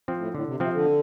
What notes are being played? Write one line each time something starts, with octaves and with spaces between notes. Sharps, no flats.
F3 C4
A2
A2 D3
C3
C3 F3 C4
D3